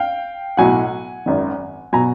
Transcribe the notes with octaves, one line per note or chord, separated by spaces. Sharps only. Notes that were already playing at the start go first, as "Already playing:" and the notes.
Already playing: F5 G5
B1 A2 F#3 F#5 G#5
G#1 F#2 D#3
B2 F#3 G#5 A#5